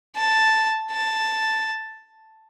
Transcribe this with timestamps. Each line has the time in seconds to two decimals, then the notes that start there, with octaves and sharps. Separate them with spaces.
0.17 A5
0.92 A5